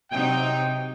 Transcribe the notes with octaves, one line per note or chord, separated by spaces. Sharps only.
C3 F#3 D#4 G5